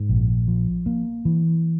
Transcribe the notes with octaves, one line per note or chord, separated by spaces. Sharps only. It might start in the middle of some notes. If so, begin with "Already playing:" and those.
Already playing: G#2
A#1
F3
A#3
E3